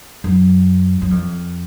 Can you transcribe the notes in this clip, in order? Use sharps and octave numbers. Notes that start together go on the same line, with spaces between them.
F#2
F#2
F2